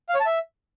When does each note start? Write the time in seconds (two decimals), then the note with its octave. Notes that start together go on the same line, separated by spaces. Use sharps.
0.09 F5
0.15 C#5
0.20 A5
0.26 E5